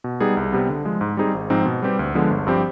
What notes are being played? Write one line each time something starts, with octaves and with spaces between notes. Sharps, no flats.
B2
G3 B3 D#4 G#4
C2
C3 G3 B3
D3
F3 G#3
G#2
G3 C4 D#4 G#4
G#1
G#2 F3 C4 D#4
B2
G3 C4 G4 B4
D2
D3 F3 G#3 B3
G1
G2 F3 C4 G4